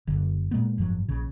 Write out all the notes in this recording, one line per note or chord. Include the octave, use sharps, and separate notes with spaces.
F#1 D3
A#2 G#3 A#3 B3
F#1 G#2 F3 F#3
A#1 C#3